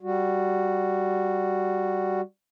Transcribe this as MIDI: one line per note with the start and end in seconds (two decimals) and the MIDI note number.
0.01 2.21 55
0.01 2.21 66